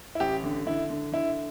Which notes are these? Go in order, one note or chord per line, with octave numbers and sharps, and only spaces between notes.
E4
A1 G4
D3
D3 E4
D3
D3 E4